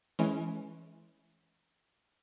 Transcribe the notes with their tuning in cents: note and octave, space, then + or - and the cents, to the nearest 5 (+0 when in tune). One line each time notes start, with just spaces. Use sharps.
E3 +0 G#3 +30 C#4 +0